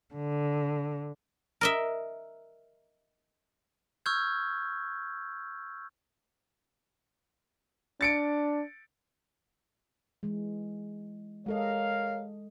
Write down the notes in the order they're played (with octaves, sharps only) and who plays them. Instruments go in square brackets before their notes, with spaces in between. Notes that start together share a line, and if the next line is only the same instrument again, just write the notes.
[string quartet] D3
[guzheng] A#4 D#5 E5
[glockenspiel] C#6 E6 F6 G6 G#6
[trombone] D4 [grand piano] A6 C#7 D7
[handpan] E3 G#3
[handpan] G#3 A4 D#5 [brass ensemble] A#4 C#5 F5